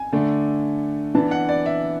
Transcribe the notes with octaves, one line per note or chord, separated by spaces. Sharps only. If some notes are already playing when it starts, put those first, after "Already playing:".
Already playing: G#5
D3 A3 D4
E3 B3 D4 A5
F#5
D5
E5